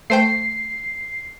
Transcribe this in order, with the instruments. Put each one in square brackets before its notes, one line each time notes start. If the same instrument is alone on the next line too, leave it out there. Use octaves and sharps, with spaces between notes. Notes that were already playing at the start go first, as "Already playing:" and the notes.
[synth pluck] A3 C5 G5 [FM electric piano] C7